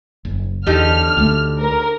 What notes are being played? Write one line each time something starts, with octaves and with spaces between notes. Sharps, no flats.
F#1
E2 D3 D#4 G4 F6
D2 A3
A#4